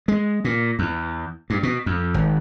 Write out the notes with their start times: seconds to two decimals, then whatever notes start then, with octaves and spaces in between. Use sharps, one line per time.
0.08 G#3
0.45 A#2
0.79 E2
1.50 G2
1.63 B2
1.86 F2
2.14 G#1